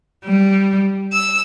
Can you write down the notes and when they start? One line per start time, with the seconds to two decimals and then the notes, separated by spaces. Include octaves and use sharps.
0.25 G3
1.12 E6